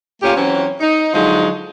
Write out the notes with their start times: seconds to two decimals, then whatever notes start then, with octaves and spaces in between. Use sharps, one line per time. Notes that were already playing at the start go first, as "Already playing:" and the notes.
0.22 A#2 A3 C#4 F4 G4
0.36 E3 F#3 C4 C#4
0.80 D#4
1.13 D3 F3 F#3 G#3 D#4